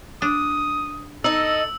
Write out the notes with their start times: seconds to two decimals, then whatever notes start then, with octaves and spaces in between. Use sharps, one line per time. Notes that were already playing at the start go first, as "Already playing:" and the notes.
0.22 D4 D#6
1.24 D#4 A4 D#5 E6